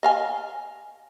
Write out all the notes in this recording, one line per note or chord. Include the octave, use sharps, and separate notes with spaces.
D#5 F5 G#5